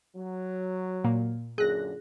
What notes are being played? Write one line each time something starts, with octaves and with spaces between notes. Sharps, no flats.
F#3
A#2 A#3
F#2 A#2 D3 G#4 F#6 A#6